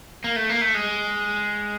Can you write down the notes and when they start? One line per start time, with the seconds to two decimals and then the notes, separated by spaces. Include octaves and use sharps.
0.24 A#3
0.36 A3
0.49 A#3
0.61 A3
0.74 G#3